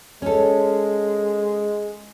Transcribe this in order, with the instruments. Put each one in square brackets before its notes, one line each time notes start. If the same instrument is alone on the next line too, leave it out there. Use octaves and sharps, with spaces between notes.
[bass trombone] G#3 [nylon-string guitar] C#4 A4